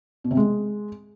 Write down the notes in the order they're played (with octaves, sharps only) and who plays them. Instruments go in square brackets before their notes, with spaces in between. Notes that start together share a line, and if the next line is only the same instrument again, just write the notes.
[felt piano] B2
C3
G#3